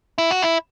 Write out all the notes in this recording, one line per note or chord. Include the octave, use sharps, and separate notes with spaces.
E4
F#4
E4